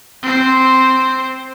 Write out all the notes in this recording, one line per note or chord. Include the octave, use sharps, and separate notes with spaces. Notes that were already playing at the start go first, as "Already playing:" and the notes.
C4 C5